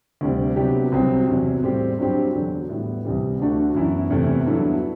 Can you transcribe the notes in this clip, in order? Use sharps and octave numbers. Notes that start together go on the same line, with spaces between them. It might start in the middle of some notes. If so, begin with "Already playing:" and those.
D2 C3 G3
C3 F#3 B3 D4 G4
C2 C3 F#3 C4
E2 C3 F#3
A2 G3 C4 G4
G2 F#3 C4 G4
E2 D3 F#3
A2 G3 B3 E4
C2 C3 E3 G3
D2 D3 A3 D4 F#4
F#2 E3 B3 E4
E2 C3 E3 A3
G2 F#3 B3 E4 A4